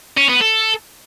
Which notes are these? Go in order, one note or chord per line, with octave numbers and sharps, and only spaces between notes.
C#4
B3
A4